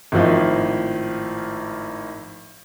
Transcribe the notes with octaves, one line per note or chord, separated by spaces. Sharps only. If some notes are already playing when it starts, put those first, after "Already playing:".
G#1 A2 F3 D#5